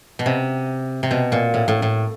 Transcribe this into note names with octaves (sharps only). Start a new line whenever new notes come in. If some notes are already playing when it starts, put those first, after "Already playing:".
B2
C3
C3
B2
A#2
A2
A2
A2